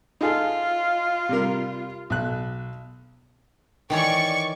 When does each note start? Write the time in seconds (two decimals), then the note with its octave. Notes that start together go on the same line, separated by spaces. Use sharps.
0.21 D#4 F4 G#4 A4
1.29 C3 G3 A#4
2.10 B1 F#6
3.90 D#3 E3 C#5 D5 C#6